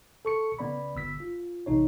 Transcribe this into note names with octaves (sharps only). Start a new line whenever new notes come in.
A4 C#6 C#7
C#3 B3 D5 B5
G1 E6 B6
F4
A1 C3 D#4 C#5